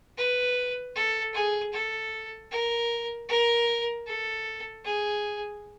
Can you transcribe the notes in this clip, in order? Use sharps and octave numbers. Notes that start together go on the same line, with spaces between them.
B4
A4
G#4
A4
A#4
A#4
A4
G#4